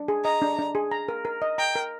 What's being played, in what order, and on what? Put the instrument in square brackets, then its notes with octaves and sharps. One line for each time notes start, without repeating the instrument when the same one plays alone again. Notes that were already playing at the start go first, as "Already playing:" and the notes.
Already playing: [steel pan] D4
G#4
[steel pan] D#5 [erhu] A#5
[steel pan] D4
D4
G#4
A#5
A#4
A#4
D#5
[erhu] G5 [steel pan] A#5
[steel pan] A#4